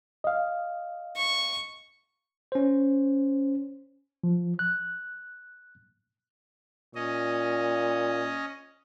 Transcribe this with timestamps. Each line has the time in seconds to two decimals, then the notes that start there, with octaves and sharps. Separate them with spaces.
0.24 D#5 F5
1.17 C#6
2.52 C#4 C5
4.24 F3
4.59 F#6
6.95 A#2 C#4 D#5